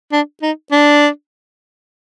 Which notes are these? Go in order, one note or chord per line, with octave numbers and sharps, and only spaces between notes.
D4
D#4
D4